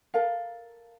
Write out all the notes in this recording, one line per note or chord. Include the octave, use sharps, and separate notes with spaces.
A4 A#4 F5